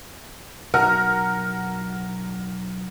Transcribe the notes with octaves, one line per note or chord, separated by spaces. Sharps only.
B1 F#4 A#4 F#5 F6